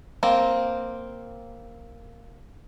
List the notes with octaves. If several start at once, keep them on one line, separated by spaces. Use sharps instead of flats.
A#3 C4